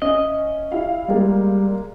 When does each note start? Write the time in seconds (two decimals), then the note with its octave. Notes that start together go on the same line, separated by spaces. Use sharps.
0.02 C#4 D#5 E5
0.72 E4 G4 F5
1.08 G3 G#3 A#3